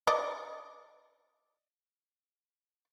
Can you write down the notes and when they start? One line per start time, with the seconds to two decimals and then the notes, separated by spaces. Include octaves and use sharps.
0.07 D5 D#5